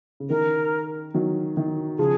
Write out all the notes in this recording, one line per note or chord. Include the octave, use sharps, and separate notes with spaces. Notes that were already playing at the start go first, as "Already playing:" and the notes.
C#3
D#3 A#4
D#3 F#3
D#3
C#3 F3 G#4